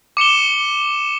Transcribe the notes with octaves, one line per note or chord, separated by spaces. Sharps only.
D6 C#7 E7 G7